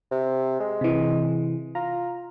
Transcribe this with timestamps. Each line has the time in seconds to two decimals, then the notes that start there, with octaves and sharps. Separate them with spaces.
0.11 C3
0.60 G#3
0.81 C3 E3
1.75 F4 A#5